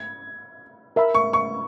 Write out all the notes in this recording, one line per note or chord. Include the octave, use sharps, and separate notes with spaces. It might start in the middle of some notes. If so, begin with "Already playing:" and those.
Already playing: G#6
A#4 E5 B5
C#6
C#6